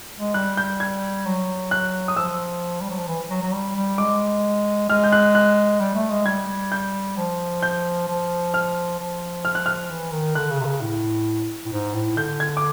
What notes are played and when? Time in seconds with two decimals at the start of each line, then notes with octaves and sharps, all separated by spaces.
0.19 G#3
0.34 G3 F#6
0.57 G6
0.80 G#6
1.26 F#3
1.71 F#6
2.08 D#6
2.16 F3 E6
2.81 G3
2.90 F#3
2.99 F3
3.08 E3
3.30 F#3
3.42 F#3
3.53 G3
3.76 G3
3.98 G#3 D6
4.90 G#3 F6
5.04 G6
5.12 F#6
5.35 F#6
5.80 G3
5.95 A3
6.10 G#3
6.26 G3 G#6
6.72 G6
7.17 F3
7.63 G6
8.08 F3
8.54 F6
8.99 F3
9.45 F6
9.55 F#6
9.66 F6
9.90 E3
10.12 D#3
10.35 D3 F#6
10.50 C#3
10.60 C3
10.65 C#3
10.81 A2
11.66 A2
11.72 G#2
11.94 A2
12.17 D3 G6
12.40 G#6
12.57 D6